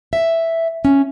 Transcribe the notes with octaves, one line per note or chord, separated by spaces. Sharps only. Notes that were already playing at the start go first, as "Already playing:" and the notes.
E5
C#4